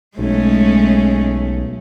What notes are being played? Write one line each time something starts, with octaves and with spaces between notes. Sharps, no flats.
B1 G#3 A3 C#4